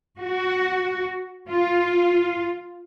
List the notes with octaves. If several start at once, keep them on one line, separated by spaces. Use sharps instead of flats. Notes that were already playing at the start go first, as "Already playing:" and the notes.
F#4
F4